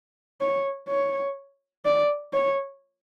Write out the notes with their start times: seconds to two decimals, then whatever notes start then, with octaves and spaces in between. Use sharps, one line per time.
0.41 C#5
0.88 C#5
1.85 D5
2.33 C#5